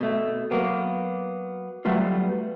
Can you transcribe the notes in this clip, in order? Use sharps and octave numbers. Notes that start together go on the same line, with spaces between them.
B2 A3
F#3 A#3 B3
F#3 G3 A3 B3 F4